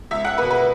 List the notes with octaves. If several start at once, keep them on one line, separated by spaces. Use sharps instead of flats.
C#2 E5
F#5
B2 A#3 B4
B4